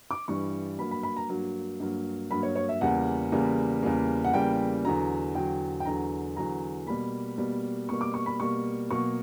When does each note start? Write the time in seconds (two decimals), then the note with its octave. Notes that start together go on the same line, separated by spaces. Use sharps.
0.11 D6
0.28 G2 E3 G3 C#6
0.79 G2 F#3 A#3 B5
0.91 B5
1.03 B5
1.17 A#5
1.29 G2 F#3 A#3
1.80 G2 F#3 A#3
2.31 G2 F#3 A#3 B5
2.43 C#5
2.56 C#5
2.69 E5
2.81 E2 C#3 G3 A#3 F#5
3.32 E2 C#3 G3 A#3
3.83 E2 C#3 G3 A#3
4.24 F#5
4.33 E2 C#3 G3 A#3 G5
4.84 E2 D3 F#3 A#5
5.34 E2 D3 F#3 G5
5.80 G5
5.85 E2 D3 F#3 A#5
6.37 E2 D3 F#3 A#5
6.87 B2 G3 A#3 B5
7.38 B2 G3 A#3
7.89 B2 G3 A#3 C#6
8.01 D6
8.14 C#6
8.26 B5
8.39 B2 G3 A#3 C#6
8.90 B2 F#3 A#3 C#6